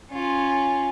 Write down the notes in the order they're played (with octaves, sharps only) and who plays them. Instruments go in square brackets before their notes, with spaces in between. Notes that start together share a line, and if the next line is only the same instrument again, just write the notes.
[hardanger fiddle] C#4 F4